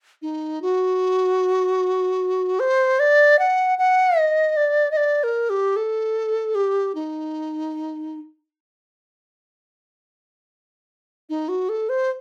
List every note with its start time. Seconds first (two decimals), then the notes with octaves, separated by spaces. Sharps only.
0.22 D#4
0.62 F#4
2.60 C5
3.00 D5
3.39 F#5
3.79 F#5
4.18 D#5
4.57 D5
4.91 D#5
4.97 D5
5.24 A#4
5.50 G4
5.76 A4
6.55 G4
6.95 D#4
11.30 D#4
11.49 F#4
11.69 A4
11.89 C5